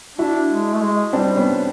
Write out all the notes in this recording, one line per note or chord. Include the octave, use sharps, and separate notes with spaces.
D4 E4 F#4
G#3
A3
G#3
G3 C4 D4
B3 C#4